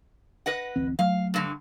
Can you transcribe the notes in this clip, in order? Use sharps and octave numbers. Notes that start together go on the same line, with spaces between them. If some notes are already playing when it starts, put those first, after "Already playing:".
B4 D#5 F#5
D1 A1 C4
F#3 A3 F5
G2 D3